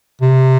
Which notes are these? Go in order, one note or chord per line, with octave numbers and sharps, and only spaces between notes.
C3